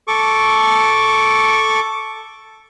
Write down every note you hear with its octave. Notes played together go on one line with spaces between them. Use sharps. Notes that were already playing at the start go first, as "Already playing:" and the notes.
A4 C#6 D6